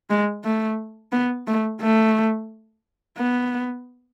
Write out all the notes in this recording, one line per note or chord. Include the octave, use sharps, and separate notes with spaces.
G#3
A3
B3
A3
A3
B3